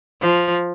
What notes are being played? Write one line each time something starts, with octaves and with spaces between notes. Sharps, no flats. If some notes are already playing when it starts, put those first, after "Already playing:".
F3